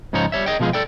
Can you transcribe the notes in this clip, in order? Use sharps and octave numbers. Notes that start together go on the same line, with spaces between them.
G#2 C#3 F3 D#4 C#5 A#5
G3 C#5 E5
G#4 D#5 G5
B2 F3 G#3 F4 G#4
A4 D5 G5